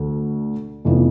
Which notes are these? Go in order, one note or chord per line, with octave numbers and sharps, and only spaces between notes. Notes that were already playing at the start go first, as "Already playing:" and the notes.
Already playing: D2 D3 A3
F1 F2 E3 B3 F4